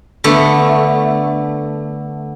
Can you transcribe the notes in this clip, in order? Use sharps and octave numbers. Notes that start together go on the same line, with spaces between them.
D3 A3 B3